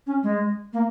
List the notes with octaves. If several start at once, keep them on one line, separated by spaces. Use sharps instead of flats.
C#4
G#3
A#3